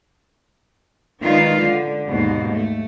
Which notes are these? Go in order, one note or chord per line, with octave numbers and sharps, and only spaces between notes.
D#3 G#3 D4 F4 B4 F5
D3
D#2 G#2 B2
A3